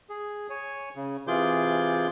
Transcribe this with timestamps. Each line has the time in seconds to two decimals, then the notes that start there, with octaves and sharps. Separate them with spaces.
0.10 G#4
0.50 C#5 G#5
0.96 C#3
1.27 C3 E3 F4 G#4 D6 G6